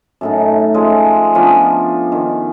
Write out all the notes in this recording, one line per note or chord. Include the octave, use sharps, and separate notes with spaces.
F#2 A2 D#4
C#3 F3 G#3 A3
F3 B3 C#4 D4
D#3